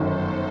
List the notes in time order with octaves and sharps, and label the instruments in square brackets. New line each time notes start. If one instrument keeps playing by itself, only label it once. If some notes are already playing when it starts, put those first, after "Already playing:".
Already playing: [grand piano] G1 F#2 D#3 [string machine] A4 C5